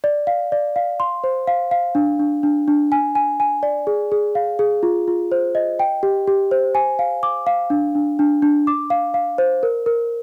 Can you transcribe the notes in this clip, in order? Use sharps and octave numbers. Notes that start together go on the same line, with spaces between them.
D5
F5
D5
F5
C6
C5
F5
F5
D4
D4
D4
D4
G#5
G#5
G#5
D5
G#4
G#4
F5
G#4
F4
F4
C5
D#5
G5
G4
G4
C5
G#5
F5
D6
F5
D4
D4
D4
D4
D6
F5
F5
C5
A#4
A#4